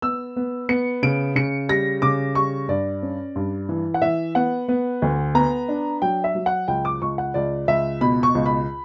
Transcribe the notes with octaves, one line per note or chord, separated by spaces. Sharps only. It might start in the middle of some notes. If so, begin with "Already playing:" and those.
B3 E6
B3
B3 C#7
C#3 D7
C#3 C#7
G3 A#6
C#3 D6
G3 C#6
G2 D5
C#4
G2
E3
F#5
E3 E5
B3 F#5
B3
D2
B3 A#5
D4
F#3 G5
E5
F#3
F#5
C#2 G5
D6
C#2 C#6
F#5
C#2 D5
C#2 E5
B2 B5
C#6
C#2
B5